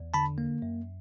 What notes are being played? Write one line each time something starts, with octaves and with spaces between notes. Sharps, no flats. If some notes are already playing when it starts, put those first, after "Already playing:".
Already playing: E2
D3 A5 B5
A#3
F#2